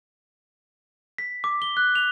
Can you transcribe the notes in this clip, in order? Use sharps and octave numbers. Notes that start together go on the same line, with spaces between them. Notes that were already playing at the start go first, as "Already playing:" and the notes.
B6
D6
G7
F#6
F7